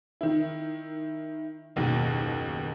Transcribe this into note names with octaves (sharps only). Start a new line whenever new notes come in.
D#3 E4
F#1 D#2 B2